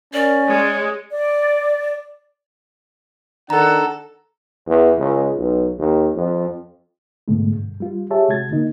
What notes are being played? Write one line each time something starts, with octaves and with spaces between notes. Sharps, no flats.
C#4 A#4 D5
G#3 C#5
D5
D#3 D4 A4 F#5 A#5
E2
C#2
B1
D#2
F2
G#2 B2 D3 G#3 A3
G2
G3 F4
G4 G#4 C#5 E5 A5
C3 G#3 F#4 G#6 A6
D3 A#3 D#4